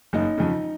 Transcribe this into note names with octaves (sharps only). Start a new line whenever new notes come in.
F#1 D#4
F2 C#3